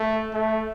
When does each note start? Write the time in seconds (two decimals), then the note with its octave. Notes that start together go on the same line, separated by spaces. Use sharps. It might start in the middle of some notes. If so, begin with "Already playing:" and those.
Already playing: A3
0.34 A3